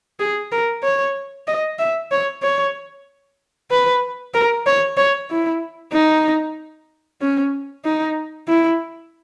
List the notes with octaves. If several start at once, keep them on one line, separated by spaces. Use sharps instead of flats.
G#4
A#4
C#5
D#5
E5
C#5
C#5
B4
A#4
C#5
C#5
E4
D#4
C#4
D#4
E4